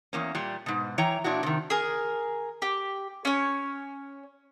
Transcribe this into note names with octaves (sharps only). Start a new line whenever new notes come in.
E2 A#3 C#4
A#2 G3
G#2 B2
E3 C#5 G5 A#5
A#2 D4 E4 F#4
C3 D#3
G#4 A#4
G4
C#4 C#5